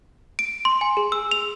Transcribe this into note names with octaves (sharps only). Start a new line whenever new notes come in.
D7
C6
G#5
G#4
E6
F7